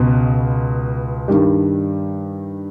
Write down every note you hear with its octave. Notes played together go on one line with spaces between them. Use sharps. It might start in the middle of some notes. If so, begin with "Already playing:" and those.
Already playing: C#2 B2 B3
G2 D#3 G3